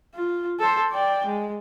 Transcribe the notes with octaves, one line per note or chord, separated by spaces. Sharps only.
F4
A4 C5
D5 G5
G#3